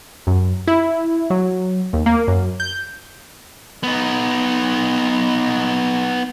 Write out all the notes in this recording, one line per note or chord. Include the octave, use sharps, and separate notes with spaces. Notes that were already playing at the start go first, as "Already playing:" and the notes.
F#2
E4
F#3
D#2
A#3
F#2
G6
B3 D#4